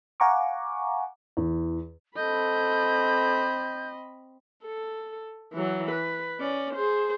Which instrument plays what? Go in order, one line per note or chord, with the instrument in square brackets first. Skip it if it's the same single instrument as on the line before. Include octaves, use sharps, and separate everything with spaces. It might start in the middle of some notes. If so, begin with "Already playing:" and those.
[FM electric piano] F5 F#5 G#5 A#5 C#6 D6
[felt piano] E2
[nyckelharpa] C4 B5 [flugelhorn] A4 [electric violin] D#5 [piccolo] G6
[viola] A4
E3 F#3
B4
C#4 D5
G#4 C5